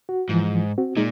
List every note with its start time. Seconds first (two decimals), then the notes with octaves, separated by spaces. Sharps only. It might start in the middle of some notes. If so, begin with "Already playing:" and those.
0.09 F#4
0.29 G#2 E3 F3
0.78 C4 F#4
0.97 A#2 G#3 D#4